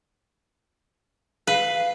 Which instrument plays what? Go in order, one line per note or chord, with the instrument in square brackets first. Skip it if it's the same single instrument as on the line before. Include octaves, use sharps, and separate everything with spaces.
[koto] B4 [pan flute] F5